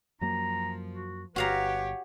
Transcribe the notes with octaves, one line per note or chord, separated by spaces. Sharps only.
F#2 F3 F#3 A#3 A#5
F#4
G1 F#4 G4 B4 C#5 F5 A#5